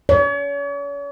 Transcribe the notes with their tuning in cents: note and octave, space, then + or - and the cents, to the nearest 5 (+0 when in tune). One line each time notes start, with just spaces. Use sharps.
C#5 +40